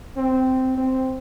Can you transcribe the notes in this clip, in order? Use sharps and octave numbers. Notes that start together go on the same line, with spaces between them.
C4
C4